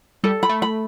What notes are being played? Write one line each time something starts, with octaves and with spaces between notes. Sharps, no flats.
G3 A4
B5
A3
B5